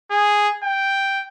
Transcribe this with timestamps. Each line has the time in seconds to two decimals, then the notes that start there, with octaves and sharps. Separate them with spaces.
0.11 G#4
0.63 G5